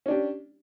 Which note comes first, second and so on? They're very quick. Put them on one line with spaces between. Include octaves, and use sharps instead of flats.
C#4 D4 G4